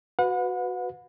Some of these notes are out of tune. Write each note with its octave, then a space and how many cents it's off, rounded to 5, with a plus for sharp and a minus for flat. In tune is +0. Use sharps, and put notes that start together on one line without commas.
F#4 +0 B4 +15 F#5 -35